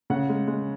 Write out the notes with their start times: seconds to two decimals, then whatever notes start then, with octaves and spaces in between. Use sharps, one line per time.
0.10 C#3 F#5
0.29 G#3
0.47 G#3